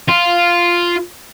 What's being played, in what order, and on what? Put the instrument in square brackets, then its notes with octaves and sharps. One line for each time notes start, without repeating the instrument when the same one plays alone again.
[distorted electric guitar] F4